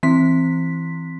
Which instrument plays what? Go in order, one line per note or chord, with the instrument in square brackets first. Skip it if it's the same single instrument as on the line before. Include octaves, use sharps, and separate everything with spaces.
[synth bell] E3 C4 C6 B6